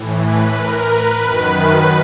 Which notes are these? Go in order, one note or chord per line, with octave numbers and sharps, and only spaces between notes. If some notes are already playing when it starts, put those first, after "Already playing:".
Already playing: A2 E3
B4
A#4
B4
F#2 D#3 B4